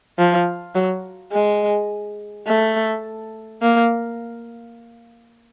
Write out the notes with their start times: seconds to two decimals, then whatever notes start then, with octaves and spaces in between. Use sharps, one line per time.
0.18 F3
0.75 F#3
1.32 G#3
2.47 A3
3.62 A#3